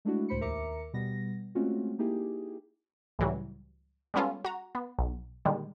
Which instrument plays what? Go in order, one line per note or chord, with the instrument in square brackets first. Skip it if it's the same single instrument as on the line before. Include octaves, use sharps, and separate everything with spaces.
[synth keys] G#3 A3 D4 E4 F#4
C#2 A2 C5 B5 C#7
D#2 A#4 E5 A#5 D6 C#7
B2 G3 B3 A#6
G#3 A3 C4 C#4 F4 F#4
A#3 D#4 E4 G4 G#4
[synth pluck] C#2 A2 E3 F#3 G3
G3 G#3 B3 C#4 F4 A4
F#4 A#5
B3
B1
A#2 D3 D#3 G3 G#3